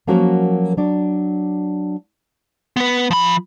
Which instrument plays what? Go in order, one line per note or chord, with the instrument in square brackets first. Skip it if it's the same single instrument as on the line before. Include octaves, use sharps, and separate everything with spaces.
[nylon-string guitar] F3 F#3 A#3 C#4 F#4 A#4
F#3 D4 D5
[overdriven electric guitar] B3 B4
F3 B5